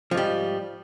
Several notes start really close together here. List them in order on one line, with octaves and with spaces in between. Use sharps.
F3 G#2 G3